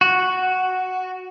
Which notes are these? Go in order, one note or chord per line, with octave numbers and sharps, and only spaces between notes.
F#4